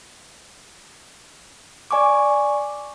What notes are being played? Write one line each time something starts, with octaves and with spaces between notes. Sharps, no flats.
D5 G#5 C#6 D6